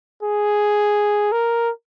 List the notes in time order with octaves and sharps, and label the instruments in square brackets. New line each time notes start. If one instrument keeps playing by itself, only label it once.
[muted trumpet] G#4
A#4